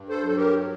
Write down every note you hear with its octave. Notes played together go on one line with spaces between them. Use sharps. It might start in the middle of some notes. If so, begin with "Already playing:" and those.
Already playing: G2
A4 C5
F#3 A4
G4 A#4